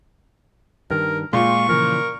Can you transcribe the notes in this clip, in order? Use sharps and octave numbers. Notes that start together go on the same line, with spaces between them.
G2 D#3 A#4
A#2 G#3 F4 C#6
C#3 E3 F3 A#4